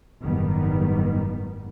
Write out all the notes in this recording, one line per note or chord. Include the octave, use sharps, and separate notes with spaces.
F#1 G#2 D#3 G3 B3